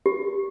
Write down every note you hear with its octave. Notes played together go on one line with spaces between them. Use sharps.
G4